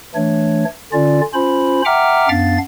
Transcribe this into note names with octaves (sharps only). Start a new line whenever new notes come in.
E3 A3 D4 C#5
D3 C#4 F4 D5
C#4 F4 C5 B5
E5 F#5 G5 A#5 D6 F6
F#2 B3 D4 F5 A6